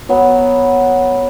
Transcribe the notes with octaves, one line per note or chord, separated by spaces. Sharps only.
F#3 B3